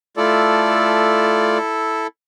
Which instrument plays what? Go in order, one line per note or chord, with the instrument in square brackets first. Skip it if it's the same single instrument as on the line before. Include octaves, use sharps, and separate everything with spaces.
[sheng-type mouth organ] A3 F4 D5 [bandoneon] E4 A4